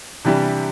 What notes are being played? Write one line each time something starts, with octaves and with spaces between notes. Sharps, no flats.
C3 E3 G3 D4 G4